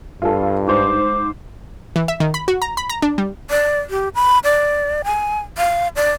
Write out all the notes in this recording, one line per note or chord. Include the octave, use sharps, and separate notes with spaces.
G2 F4 A4
G#2 C5 D6
E3
E5
D#3
B5
F#4
A#5
B5
A#5
D4
G3
D5
G4
B5
D5
G#5
F5
D5